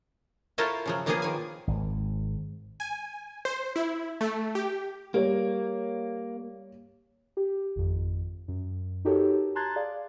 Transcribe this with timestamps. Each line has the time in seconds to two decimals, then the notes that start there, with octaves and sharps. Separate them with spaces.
0.58 E4 F4 A4 A#4 C5 C#5
0.86 C#3 F3 F#3
1.06 B2 F3 A#3 B3 F4 G#4
1.22 D#3 G#5
1.67 G#1
2.80 G#5
3.45 C5
3.76 E4
4.21 A3
4.55 G4
5.14 G3 A#3 C#5
7.37 G4
7.76 G#1 F2
8.48 F#2
9.05 D#4 F#4 G4 A4 A#4 C#5
9.55 A5 A#5 C6 F#6 G#6 A6
9.76 G#4 D5 F5